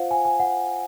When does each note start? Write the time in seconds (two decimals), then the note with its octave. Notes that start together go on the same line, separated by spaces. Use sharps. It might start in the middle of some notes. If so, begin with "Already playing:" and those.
Already playing: F4 C5 F5 F#5
0.11 G#5
0.25 G#5
0.39 F#5